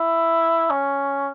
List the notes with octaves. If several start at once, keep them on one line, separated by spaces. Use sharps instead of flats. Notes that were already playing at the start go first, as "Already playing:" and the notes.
Already playing: E4
C#4